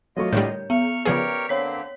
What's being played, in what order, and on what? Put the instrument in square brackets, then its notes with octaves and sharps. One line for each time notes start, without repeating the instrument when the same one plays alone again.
[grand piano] F#3 A3 C#6 [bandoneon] A#3 F4 D#5
[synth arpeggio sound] A2 D3 G3 [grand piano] A#4 C#5 [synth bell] G6
[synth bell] B3 [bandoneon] C#6 F6
[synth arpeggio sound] C#3 F3 G#4 [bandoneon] G4 A#4 C#5 [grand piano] B4 D5
[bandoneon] D3 A#3 C4 [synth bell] C#5 B6